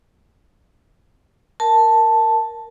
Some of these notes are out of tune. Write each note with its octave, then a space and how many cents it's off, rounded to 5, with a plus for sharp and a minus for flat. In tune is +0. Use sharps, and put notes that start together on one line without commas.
A#4 -5 A5 +0